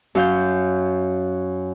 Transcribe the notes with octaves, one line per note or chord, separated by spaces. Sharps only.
F#2 F5 G6